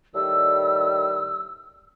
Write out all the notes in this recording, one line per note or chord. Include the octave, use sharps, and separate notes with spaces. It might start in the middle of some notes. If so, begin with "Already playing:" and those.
A2 D#3 G3 E6